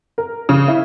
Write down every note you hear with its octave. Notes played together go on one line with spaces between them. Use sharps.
A#4
C#3
E4